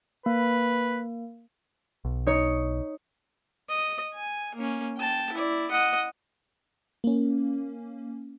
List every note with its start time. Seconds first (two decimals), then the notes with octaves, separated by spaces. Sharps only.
0.26 A#3 B4
2.05 B1
2.27 D#4 C#5
3.69 D#5
4.14 G#5
4.55 A#3 C#4
4.97 G5 A5
5.33 E4 D5
5.71 D#5 F#5
7.04 A#3 C#4